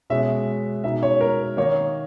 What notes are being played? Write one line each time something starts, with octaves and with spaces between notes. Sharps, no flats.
B2 G#3 C#4 E4 E5
B2 G#3 D#4 E5
C#5
A#4
D#3 A#3 D#4 C#5